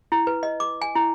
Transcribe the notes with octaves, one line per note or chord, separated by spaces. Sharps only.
E4
B4
D#5
D6
G#5
E4